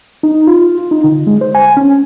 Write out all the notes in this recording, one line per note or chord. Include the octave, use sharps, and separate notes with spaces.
D#4
F4
D#4
D3
G#3
C5
G#5
C#4